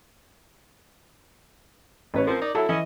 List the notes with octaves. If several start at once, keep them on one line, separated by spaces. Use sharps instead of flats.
A1 B4 C#5
F3 C4 A#4
D#4 D5
F#3 E4 A4
E3 C#4 E4 D#5